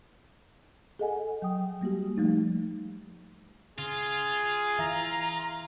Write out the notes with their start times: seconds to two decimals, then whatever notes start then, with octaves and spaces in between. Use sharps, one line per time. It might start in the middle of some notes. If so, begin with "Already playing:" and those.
0.99 G#4 A4 D#5 F#5 G#5
1.42 F#3 G5 D#6
1.81 G3 A#3 F#4 G4
2.17 F3 G3 A3 D#4
3.79 C#3 F4 G#4
4.79 E3 E5 F5 A#5